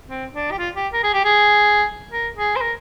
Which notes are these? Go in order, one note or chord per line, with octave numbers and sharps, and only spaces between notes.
C4
D4
G4
F4
G4
A#4
G#4
G4
G#4
A#4
G#4
C5
A#4